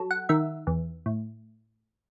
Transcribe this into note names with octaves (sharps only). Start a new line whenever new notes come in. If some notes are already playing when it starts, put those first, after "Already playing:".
Already playing: F#3 A4
F#5
D#3 E5
E2
A2